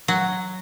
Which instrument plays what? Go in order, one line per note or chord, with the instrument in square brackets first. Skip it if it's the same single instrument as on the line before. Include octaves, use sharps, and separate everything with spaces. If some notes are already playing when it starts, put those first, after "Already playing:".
[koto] F#3